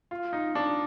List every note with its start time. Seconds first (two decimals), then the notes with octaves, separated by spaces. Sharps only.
0.11 F4
0.33 D#4
0.55 D4